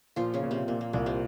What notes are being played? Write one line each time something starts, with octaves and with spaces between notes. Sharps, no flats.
A#2 F3 F4
C#3 C#4
A#2
C3 C4
A#2 A#3
A#3
C2 A#3
C3 C4